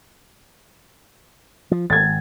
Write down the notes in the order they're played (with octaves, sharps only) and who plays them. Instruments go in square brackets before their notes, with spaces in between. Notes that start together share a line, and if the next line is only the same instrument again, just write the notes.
[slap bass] F3
[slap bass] G#1 [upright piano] G#6 A6